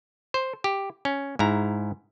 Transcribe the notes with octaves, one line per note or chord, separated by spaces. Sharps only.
C5
G4
C#4
G#2 E4 A#5